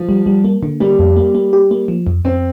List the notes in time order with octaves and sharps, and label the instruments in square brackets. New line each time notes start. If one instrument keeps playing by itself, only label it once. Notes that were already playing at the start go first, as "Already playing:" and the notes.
Already playing: [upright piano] F3
[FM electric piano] G3
G3
A#3
D3
[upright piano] G3 [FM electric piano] A#3
[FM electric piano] F2
A#3
A#3
G4
A#3
F3
F2
[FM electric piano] F2 [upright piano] C4